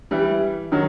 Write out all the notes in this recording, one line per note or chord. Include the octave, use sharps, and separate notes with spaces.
E3 G3
D#3 F#3